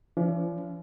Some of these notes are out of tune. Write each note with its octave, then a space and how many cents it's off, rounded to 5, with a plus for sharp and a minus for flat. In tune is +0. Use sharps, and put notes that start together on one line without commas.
F3 -45 D4 -45